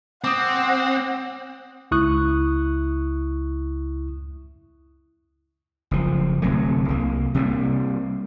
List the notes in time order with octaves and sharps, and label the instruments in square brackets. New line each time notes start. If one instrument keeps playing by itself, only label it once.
[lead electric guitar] C4 [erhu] F#5 [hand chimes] D6 D#6
[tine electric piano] C#2 E4 C#6 D#6 F#6
[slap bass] F#1 F3
D1 C3 F#3 A3
C2 A#3
C3 G3 A3 A#3